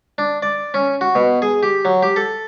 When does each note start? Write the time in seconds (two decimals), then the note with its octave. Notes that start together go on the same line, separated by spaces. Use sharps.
0.18 D4
0.42 D5
0.74 C#4
1.01 F#4
1.15 B2
1.42 G#4
1.63 G4
1.85 F#3
2.03 G4
2.16 A4